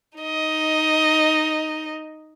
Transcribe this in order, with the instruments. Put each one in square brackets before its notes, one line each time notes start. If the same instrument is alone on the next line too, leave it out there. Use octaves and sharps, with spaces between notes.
[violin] D#4 D#5